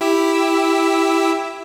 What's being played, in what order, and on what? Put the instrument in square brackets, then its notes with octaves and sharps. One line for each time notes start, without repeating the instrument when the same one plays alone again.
[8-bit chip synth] E4 G4 E6